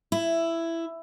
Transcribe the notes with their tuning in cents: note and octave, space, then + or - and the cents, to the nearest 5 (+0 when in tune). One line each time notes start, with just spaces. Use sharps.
E4 +10